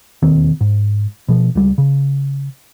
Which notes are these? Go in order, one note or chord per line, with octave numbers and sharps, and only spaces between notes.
E1 D#2 D#3 C4
G#2
B2 F3
C#2 G3
C#3